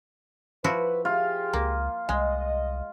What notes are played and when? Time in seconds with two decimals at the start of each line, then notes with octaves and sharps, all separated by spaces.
0.64 F3 E4 F#4 B4
1.05 F4 G4 G#4
1.53 C#2 A#3
2.09 C2 G#3 D#5